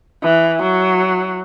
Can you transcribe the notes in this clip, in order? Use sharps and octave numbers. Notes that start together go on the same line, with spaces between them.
E3
F#3